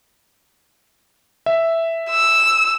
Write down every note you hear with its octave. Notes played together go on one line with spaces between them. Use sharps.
E5
E6